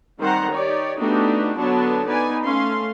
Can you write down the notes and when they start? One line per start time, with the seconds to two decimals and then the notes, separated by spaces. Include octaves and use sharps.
0.20 D#3 G3 C4 C5 F#5 A#5
0.53 D#4 G4 C#5 D5
0.99 A3 B3 D4 D#4 F#4 G4
1.59 D3 F#3 B3 D4 C#5 A5
2.07 B3 D#4 B4 D5 G#5
2.44 A3 C#4 F5 C6